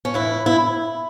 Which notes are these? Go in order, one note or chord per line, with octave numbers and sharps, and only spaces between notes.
C#4
A2 E3 E4
E4